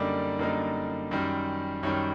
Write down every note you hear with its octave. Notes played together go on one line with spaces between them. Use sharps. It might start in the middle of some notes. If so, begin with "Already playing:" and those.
Already playing: F#2 D3 G3 A#3 D#4 D5
F#2 D3 G3 A#3 D#4
F#2 D#3 G3
F#2 D#3 G3 C#5